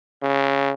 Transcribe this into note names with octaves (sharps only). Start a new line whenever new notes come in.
C#3